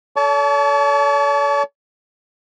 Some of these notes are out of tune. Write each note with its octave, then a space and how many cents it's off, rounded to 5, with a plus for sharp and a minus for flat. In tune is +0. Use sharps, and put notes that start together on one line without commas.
A4 +0 C#5 +45 A5 -25